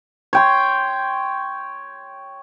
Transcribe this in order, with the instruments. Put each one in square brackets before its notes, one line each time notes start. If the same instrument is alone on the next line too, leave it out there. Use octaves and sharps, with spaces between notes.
[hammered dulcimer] C#5 G5 C6